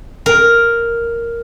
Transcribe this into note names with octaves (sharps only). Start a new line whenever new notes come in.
A#4